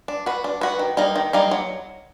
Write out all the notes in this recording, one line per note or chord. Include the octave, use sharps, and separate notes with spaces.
D4
F#4 B4
D4
F#4 B4
D#3
G3 A#3 D#4
D#3
G3 A#3 D#4
F#3